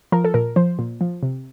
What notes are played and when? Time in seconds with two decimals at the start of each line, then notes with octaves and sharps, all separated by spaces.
0.12 F3 A#4
0.25 A4
0.34 A#2 A#4
0.56 F3 C5
0.79 A#2
1.01 F3
1.23 C3